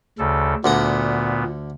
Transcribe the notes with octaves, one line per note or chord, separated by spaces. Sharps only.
D2 C#3 A4
D2 A#2 D3 B3 A#5